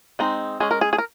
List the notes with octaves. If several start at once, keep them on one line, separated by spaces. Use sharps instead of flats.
G#3 C4 D#4
G#3 C#4 G#4
A#4
G#4
G#4
A#4